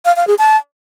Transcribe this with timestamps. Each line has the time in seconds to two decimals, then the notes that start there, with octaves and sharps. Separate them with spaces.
0.05 F5
0.16 F5
0.27 G#4
0.38 A5